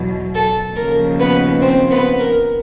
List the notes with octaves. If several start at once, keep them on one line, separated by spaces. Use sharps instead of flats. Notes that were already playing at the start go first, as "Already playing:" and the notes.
Already playing: E2 B2 F#3
A4
D#2 C#3 F3 A#4
B3 B4
C4 C5
B3 B4
A#4